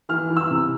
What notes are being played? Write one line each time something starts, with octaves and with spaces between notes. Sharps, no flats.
E3 F6
E3
E6
C3